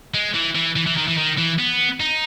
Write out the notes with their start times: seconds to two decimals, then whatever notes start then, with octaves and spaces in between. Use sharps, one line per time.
0.14 G#3
0.35 E3
0.55 E3
0.76 E3
0.86 E3
0.97 D#3
1.07 E3
1.17 D#3
1.38 E3
1.59 B3
2.00 D#4